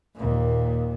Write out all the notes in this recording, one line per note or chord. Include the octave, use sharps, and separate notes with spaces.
D#2 A#2